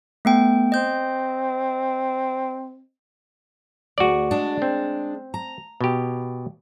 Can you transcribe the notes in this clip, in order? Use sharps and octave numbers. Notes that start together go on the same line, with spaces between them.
A3 B3 G5
C4 D#5 G6
D2 F#4 G#4 D5
G#3 D4 G#4
C4
A#5
B2 G4